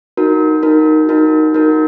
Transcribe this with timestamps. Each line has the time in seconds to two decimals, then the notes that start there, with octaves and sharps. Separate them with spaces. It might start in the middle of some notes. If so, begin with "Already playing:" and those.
0.17 D#4 F#4 A#4
0.63 D#4 F#4 A#4
1.09 D#4 F#4 A#4
1.54 D#4 F#4 A#4